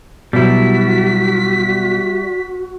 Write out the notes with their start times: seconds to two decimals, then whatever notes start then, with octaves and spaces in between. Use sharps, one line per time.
0.33 B2 F#3 G3 E4 F#4 B6